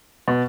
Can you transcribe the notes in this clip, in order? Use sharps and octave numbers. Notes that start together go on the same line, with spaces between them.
B2